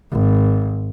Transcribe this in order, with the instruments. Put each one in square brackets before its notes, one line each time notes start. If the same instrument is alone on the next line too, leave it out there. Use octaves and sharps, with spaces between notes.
[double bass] G#1